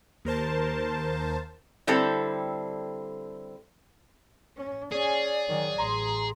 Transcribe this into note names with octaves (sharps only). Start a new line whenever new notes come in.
D#2 A#4 C5 A5
D3 G3 C4 E4 A4
C#4
C#4 G#4 D5 G#5
D#3 F#3
A1 A#5 C6